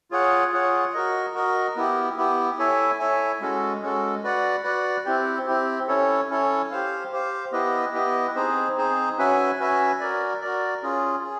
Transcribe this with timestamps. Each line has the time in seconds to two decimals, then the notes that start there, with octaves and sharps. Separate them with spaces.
0.11 F4 G#4 C#5 F#5
0.52 F4 G#4 C#5 F#5
0.94 F#4 A#4 D#5
1.34 F#4 A#4 D#5
1.76 B3 E4 G4
2.17 B3 E4 G4
2.58 E4 A4 C#5 E5 G#5
2.99 E4 A4 C#5 E5 G#5
3.40 G#3 C#4 F#4 A4
3.82 G#3 C#4 F#4 A4
4.23 F#4 B4 D5 F#5
4.64 F#4 B4 D5 F#5
5.05 C4 E4 G4
5.47 C4 E4 G4
5.88 C#4 E4 A4 C#5
6.30 C#4 E4 A4 C#5
6.71 G4 C5 F5
7.12 G4 C5 F5
7.52 B3 E4 G4 B4 D#5
7.94 B3 E4 G4 B4 D#5
8.35 C4 D#4 G#4 C5
8.77 C4 D#4 G#4 C5
9.18 C#4 F#4 B4 E5 G#5
9.59 C#4 F#4 B4 E5 G#5
10.00 F#4 A#4 D5
10.41 F#4 A#4 D5
10.83 C#4 F4 G#4
11.23 G#4